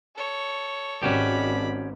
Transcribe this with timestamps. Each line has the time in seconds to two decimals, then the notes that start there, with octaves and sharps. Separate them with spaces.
0.15 A4 C#5
1.03 G#1 C#4 F#4 G4 D5 B5